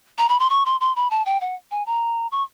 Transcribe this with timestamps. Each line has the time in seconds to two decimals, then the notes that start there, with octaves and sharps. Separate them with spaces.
0.18 A#5
0.29 B5
0.39 C6
0.50 C#6
0.66 C6
0.80 C6
0.96 B5
1.10 A5
1.26 G5
1.41 F#5
1.71 G#5
1.86 A#5
2.32 C#6